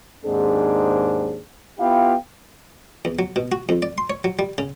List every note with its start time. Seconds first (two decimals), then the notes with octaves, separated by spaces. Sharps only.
0.24 D#2 G#2 C4 D4 G#4
1.79 B3 E4 F4 G4 F5 G5
3.05 E2
3.19 F#3
3.36 B2
3.52 F#4
3.69 F2
3.82 D5
3.98 C6
4.10 C#5
4.24 F#3
4.39 G3
4.58 C#3